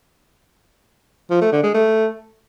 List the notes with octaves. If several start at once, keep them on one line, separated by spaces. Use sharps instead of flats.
F3
A3
D3
G#3
A3